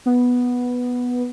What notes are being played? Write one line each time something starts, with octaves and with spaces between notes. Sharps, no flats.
B3